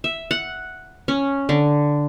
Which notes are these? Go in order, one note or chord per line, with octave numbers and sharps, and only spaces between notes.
E5
F#5
C#4
D3